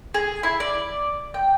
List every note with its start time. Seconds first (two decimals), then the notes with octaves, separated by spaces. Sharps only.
0.14 G#4
0.43 E4
0.60 D5
1.34 G5